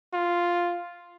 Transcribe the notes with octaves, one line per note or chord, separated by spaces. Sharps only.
F4